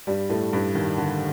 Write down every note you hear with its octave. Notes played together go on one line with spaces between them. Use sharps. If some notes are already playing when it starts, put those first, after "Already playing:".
G2 G3
A2 A3
G2 G3
D#2 D#3
D3